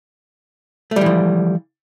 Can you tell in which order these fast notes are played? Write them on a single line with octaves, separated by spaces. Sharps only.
A3 G3 E3 F3